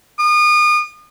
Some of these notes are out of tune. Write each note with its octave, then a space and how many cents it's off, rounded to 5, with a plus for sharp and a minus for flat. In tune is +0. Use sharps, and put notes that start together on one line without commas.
D#6 -35